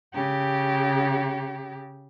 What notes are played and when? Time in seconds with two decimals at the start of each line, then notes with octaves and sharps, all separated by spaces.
0.14 C#3 G4